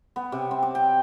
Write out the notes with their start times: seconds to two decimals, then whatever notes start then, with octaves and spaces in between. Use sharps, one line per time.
0.16 B3
0.32 C3
0.51 C4
0.63 D6
0.75 G5